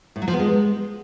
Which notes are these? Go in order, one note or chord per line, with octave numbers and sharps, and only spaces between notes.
A2
F#3
F3
B3
G#3